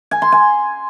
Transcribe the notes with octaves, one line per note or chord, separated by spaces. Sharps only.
G#5
C6
G#5